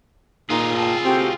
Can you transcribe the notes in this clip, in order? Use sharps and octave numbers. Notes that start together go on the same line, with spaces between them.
A#2 D#4 F4 G#4
G5 A5
C4 F#4 G4 A4